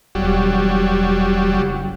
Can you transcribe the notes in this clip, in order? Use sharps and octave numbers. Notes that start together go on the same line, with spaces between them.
E1 F#3 G3
F#1